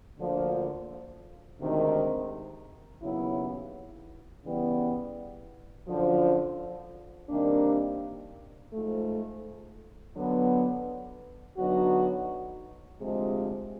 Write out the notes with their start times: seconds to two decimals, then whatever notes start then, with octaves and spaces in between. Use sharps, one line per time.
0.17 D2 D3 F3 A#3
1.60 D2 C3 D#3 G#3
3.02 D#2 C#3 F#3 B3 E4
4.45 C#3 E3 G3 B3
5.87 F#2 D3 F3
7.30 C3 D#3 G3 A#3 D4
8.72 G#2 F3 A3
10.15 D3 F#3 B3
11.58 D3 F#3 B3 D#4 F#4
13.01 D2 C3 F3 G#3